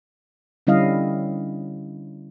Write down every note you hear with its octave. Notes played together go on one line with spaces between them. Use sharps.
D3 G3 C#4 E4 D#5 F5